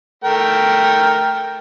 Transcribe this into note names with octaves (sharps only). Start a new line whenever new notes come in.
A3 A#4 G5